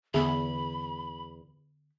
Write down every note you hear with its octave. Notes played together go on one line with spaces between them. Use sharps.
E2 D3 B3 G#4 E5 B5